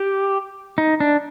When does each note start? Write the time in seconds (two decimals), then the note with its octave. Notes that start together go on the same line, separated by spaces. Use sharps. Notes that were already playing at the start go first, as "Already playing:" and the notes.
Already playing: G4
0.78 D#4
1.00 D4